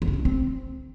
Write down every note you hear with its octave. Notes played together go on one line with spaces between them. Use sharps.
D3
C#4
D3
F#3
C4